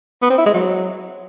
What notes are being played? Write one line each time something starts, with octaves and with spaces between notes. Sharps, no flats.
B3
C4
E4
G#3
F#3